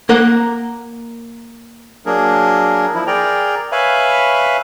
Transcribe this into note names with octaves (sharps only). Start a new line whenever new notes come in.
A#3 A#4 F#5
F#3 A#3 D4 G#4 A#4
F3 E4
G#4 A#4 D5 G5 A#5
B4 C#5 E5 F5 G#5 B5